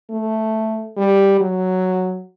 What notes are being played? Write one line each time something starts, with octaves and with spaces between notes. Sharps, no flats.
A3
G3
F#3